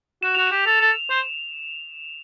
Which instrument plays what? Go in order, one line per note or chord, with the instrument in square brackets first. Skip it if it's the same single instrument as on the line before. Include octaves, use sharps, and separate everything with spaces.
[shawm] F#4 [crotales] E7
[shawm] F#4 [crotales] F7
[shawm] G4 [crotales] E7
[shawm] A4
A4
C5